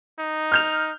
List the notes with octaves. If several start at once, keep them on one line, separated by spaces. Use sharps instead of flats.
D#4
F6 G6 F7